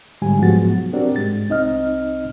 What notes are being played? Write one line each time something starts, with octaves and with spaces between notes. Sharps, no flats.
G#2 D3 G3 G#3 G4 G#5
G#2 F3 F#3 B3 F#4 A6
C4 D4 F#4 G4 A#4 D5
G#2 G#3 A6
C2 C4 D#4 D#5 F6